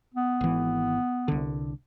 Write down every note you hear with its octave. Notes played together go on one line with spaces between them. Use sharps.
B3
G#1 E3
C2 D3